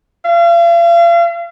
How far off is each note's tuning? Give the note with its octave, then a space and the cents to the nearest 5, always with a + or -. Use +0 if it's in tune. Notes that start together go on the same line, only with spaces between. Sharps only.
F5 -40